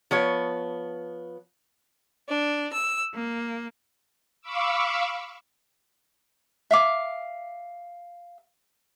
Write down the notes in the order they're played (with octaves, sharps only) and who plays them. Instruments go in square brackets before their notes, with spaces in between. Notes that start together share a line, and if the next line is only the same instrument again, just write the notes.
[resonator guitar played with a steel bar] F3 B3 C#5
[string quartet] D4
E6
A#3
[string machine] F5 B5 C#6 D6 E6
[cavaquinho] E5 F5 D6